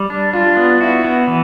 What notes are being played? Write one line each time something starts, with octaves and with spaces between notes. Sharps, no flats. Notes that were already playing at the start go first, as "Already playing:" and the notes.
Already playing: G3
D4
D4 F4
B3
E4 F#4
B3
E3